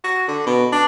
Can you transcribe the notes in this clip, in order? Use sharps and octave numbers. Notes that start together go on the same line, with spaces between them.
F#4
D3
B2
D4